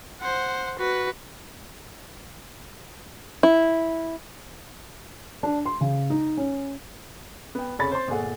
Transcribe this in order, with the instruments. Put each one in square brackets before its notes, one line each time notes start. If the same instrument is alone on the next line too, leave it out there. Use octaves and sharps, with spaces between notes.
[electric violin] C5 F#5
F#4 B4
[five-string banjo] E4
[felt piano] D4
C6
C#3
D#4
C#4
[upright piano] B3 G5
F1 C#3 C#5 B5 A6
C5 C6
G1 A#2 A3 G#4 F#5